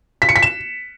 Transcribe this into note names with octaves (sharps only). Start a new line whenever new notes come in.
B6
C#7
B6
E7